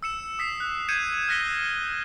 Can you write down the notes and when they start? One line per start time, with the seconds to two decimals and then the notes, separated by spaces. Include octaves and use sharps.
0.03 E6 C#7 E7
0.39 D#6 B6 C7
0.60 F#6
0.89 G6 G#6 C#7 D#7 E7
1.28 F6 F#6 A#6 B6 C#7 G7